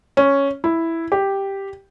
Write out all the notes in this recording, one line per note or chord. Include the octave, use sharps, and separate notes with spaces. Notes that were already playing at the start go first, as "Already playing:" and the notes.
C#4
E4
G4